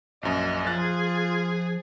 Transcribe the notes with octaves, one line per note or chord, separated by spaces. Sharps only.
A#1 F#2 D#5
F3 F4 G#4 F#6 A6